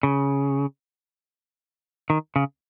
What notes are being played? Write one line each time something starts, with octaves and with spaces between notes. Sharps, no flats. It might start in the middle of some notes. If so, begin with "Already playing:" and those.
C#3
D#3
C#3